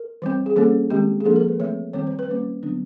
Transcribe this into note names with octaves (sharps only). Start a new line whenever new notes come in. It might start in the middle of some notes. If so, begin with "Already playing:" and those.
Already playing: A#4
E3 G3 C4
G#4
E3 G3 A#3 C#4 A4
D#3 G#3 C4 G4
G#4
F3 A#3 D4 A4
A#4
B4
E3 A3 C4 C#5
D#3 G3 C4 C#5
C5
B4
G3 A#3 C#4 C5
D3 F#3 B3 D4